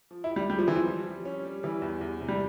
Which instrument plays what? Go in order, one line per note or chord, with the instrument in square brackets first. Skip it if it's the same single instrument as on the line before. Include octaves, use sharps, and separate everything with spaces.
[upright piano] F3
[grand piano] E4
[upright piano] G4
[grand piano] G3
[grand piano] G3 [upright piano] G#3
[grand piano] F3
[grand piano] E3 [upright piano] C4
[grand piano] F3
[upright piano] G3
G3
C#4
G3
[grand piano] E3 [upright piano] G3
[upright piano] E2
E2
C3
[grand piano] G3